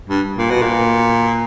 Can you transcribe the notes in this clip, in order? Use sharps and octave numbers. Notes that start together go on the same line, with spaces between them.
G2
A#2
B2
A#2